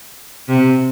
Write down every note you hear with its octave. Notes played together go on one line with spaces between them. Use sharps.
C3